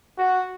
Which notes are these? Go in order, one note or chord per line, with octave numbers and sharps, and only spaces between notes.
F#4